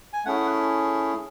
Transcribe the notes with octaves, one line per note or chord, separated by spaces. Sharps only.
G#5
A3 C#4 E4 G#4 F#5